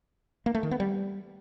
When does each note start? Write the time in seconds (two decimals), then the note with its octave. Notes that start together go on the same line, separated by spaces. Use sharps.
0.46 A#3
0.55 A3
0.63 D#3
0.71 B3
0.80 G3